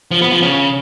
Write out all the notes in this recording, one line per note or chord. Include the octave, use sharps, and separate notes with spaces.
F3
B3
F3
C#3